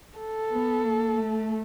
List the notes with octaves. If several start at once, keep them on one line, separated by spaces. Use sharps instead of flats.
A4
B3
A#3
A3